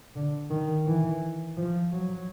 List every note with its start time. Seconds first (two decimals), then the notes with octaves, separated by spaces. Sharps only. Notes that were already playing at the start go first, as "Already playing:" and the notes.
0.16 D3
0.50 D#3
0.86 E3
1.57 F3
1.92 F#3